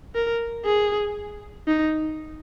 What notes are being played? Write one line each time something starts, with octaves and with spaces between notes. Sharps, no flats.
A#4
G#4
D#4